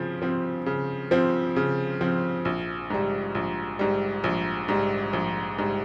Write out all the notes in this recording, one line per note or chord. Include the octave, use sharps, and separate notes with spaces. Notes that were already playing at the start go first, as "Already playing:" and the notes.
Already playing: C#3 F3 C4
F3 C4
C#3
F3 C4
C#3
F3 C4
A#1
G#2 G3
A#1
G#2 G3
A#1
G#2 G3
A#1
G#2 G3